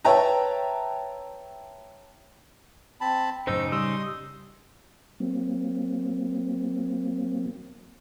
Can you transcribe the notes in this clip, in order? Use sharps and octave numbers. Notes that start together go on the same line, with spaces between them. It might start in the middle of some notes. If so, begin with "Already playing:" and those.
B4 C#5 E5 G5 A5 A#5
C4 A5 B5
F#2 A2 C#3 D#4 C5 E6
G3 C6 D#6 E6
F#3 A#3 C4